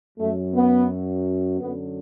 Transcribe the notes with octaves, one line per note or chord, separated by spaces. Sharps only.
F#2 F#3 A3
B3
F#2 D3 F#3 B3